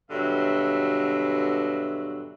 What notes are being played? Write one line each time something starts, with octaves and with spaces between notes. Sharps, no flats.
G2 B2 D3 F#3 E5